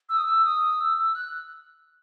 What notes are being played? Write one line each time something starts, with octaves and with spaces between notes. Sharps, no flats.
E6
D#6
E6
D#6
E6
E6
F#6